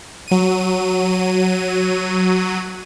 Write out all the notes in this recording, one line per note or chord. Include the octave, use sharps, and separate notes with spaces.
F#3 D#7